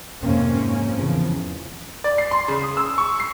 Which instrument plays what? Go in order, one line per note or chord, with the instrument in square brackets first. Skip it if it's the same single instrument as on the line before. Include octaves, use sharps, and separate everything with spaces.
[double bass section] F2 G#2 C3 A#3 C4 C#4
E2 C#3 F3
[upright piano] D5
C7
C6
C#3
D#6
E6
C#6
C7